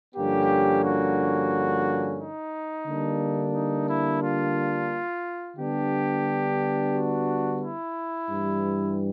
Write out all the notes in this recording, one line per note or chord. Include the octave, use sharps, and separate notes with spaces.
G2 D3 F3 A#3 C#4 G4
F#4
D#4
D3 G3 A#3 D4
D#4
E4
F4
D3 G3 B3 D4 G4
F#4
E4
G2 E3 G3